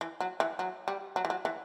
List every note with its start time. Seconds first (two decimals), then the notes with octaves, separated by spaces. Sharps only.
0.01 E3
0.21 F#3
0.40 E3
0.59 F#3
0.88 G3
1.16 F#3
1.25 E3
1.30 F#3
1.45 E3